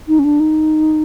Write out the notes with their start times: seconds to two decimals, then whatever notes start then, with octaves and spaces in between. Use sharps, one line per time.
0.08 D#4
0.19 C#4
0.24 D4
0.40 D#4